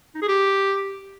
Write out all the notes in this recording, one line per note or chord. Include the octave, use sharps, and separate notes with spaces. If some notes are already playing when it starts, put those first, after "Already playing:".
D#4
G#4
G4